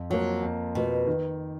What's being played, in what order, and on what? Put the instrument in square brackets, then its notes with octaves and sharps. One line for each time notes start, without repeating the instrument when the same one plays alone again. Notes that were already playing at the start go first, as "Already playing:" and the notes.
Already playing: [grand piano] F2
[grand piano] F3 A#3 [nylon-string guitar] F#3
[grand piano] F2
[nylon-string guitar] B2 [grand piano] F3 A#3
[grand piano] D#3